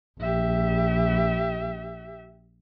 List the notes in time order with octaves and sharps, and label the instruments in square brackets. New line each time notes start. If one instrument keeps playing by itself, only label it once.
[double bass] A#1 [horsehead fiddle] G4 E5